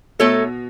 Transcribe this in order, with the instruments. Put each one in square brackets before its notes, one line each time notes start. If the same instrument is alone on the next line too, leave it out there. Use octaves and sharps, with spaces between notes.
[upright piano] B2 [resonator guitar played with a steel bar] A3 D#4 A4 C#5